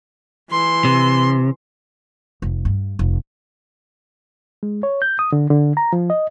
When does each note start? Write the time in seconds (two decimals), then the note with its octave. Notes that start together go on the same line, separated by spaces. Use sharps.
0.51 E3 C6
0.85 C3
2.42 F1
2.65 G2
2.99 F1
4.63 G#3
4.83 C#5
5.02 G6
5.19 D#6
5.32 D3
5.50 D3
5.77 A#5
5.93 F3
6.10 D#5